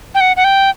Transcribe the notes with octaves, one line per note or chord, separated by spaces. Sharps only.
G5
F#5
F#5
G5